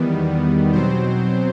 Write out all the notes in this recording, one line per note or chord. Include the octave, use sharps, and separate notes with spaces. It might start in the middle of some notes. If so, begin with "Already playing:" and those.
Already playing: E2 D#3 G3 B3
B2 F#3 C4 C5